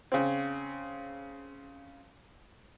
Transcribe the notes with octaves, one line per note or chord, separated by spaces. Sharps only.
C#3 C4